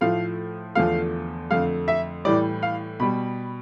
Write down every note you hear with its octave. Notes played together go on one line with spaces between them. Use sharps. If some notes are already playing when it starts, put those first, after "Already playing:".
A2 F3 A3 F5
E2 D3 F3 A3 F5
F2 D3 A3 F5
E5
A2 E3 G3 D5
F5
B2 G3 B5